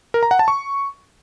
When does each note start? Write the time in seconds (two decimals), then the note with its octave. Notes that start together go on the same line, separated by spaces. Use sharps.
0.14 A#4
0.23 A#5
0.31 F#5
0.39 A5
0.48 C#6